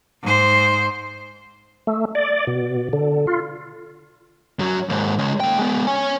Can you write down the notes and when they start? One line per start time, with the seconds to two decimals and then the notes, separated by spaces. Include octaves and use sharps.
0.22 G#2 C5
1.87 A3
2.15 D5
2.47 B2
2.93 D3
3.27 F4
4.59 F#2 F#3
4.89 D#2 G#2
5.19 C#3 G#3
5.40 A#3 G5
5.58 G#3 B3
5.87 C#5 G#5